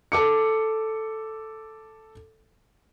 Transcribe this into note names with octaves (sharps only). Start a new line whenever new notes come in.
A4 D6 C#7